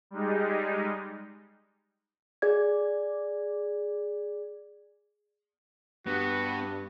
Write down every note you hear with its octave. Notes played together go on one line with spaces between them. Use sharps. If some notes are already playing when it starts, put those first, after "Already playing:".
G3 G#3 D#4
G#4 D5 G#6
G2 B3 F#4